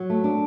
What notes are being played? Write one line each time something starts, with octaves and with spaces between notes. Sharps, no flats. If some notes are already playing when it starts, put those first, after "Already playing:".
Already playing: F#3
A3
D4